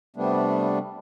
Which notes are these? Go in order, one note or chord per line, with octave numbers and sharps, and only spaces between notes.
C3 G3 A3 B3 D4